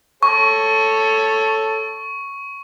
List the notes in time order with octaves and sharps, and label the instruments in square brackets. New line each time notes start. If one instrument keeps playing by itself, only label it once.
[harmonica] A4 C#5 [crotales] C#6